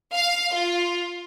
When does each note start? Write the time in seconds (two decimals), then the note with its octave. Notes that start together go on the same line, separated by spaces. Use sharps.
0.14 F5
0.53 F4